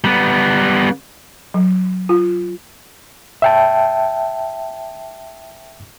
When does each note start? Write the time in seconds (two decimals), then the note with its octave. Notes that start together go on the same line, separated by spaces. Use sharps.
0.04 G3 B3
1.54 F#3
2.09 F4
3.42 E5 G5 A5